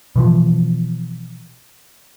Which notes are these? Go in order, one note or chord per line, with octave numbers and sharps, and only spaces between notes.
B2 E3 F3